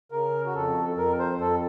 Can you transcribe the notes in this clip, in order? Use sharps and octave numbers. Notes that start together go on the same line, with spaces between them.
C#3 A#4
F#4
F2 A4
F2 A#4
C5
F2 A4